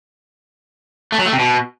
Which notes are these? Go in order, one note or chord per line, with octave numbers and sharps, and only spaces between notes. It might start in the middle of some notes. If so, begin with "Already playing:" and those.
A3
F#3
A3
C3
B2